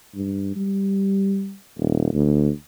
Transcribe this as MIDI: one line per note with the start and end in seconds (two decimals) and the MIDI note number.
0.15 0.54 43
0.56 1.55 55
1.78 2.11 27
2.14 2.50 38